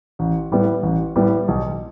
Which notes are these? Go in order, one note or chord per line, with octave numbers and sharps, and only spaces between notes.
A1
A2 G3 B3
A1
A2 G3 B3
B1